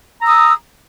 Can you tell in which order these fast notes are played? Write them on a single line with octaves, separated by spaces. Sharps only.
A#5 E6 D#6